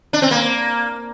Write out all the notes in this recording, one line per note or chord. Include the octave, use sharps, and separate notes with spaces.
D4
C4
A#3